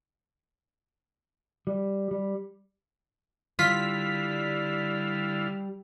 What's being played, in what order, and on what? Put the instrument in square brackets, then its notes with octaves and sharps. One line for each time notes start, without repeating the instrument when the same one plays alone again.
[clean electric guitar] G3
G3
[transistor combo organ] D3 E4 F5 [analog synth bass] G3 [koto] F4 [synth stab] B6